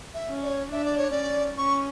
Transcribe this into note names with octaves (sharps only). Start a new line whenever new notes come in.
E5
C#4
D5
C#5
D4 E5
D5
C#5
C#4 D5
C#4 C#6